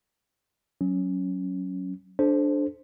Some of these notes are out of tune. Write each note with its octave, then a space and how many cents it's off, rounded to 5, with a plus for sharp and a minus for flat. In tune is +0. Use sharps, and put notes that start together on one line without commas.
F#3 +10 C#4 +0
D4 +0 A4 -35 C5 +0